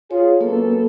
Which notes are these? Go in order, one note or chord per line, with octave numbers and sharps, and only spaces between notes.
F4 G#4 C#5
F#2 A#3 B3 A4